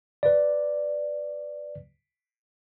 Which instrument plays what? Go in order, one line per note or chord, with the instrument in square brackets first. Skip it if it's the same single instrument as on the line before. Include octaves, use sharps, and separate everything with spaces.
[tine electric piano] B4 D5